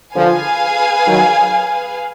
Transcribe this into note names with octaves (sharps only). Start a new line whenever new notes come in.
D3 F3 G#4 B4 F5 G#5
D#3 F#3